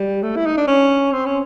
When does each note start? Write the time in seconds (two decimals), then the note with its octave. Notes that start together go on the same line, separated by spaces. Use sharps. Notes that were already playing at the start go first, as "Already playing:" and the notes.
Already playing: G3
0.23 A3
0.36 E4
0.46 D#4
0.57 D4
0.67 C#4
1.12 C4
1.26 C#4